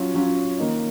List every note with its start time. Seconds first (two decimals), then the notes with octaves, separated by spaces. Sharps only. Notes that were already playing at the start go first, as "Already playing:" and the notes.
Already playing: F#3 C#4 F4
0.14 F#3 C#4 F4
0.58 D#3 A#3 D#4